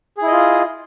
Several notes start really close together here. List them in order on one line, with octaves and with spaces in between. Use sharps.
G#4 E4 D#5 F4